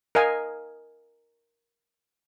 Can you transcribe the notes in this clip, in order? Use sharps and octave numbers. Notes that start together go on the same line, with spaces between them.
A#4 D#5 F5 G#5